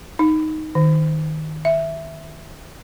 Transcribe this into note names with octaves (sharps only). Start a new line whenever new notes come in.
D#4
D#3
E5